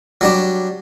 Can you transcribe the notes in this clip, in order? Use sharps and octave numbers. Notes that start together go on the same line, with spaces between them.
F#3 G3 D4